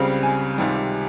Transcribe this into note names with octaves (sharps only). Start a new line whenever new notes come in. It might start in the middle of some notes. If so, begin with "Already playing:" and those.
Already playing: C#2 C#3 G3 C4
G#5
C#2 C3 D#3 G3